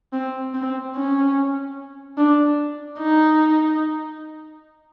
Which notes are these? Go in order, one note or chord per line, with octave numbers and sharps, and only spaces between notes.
C4
C4
C#4
D4
D#4